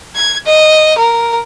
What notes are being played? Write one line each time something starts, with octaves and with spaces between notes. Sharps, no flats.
G#6
D#5
A#4